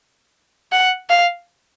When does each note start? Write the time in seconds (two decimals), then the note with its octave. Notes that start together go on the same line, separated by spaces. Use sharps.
0.72 F#5
1.10 F5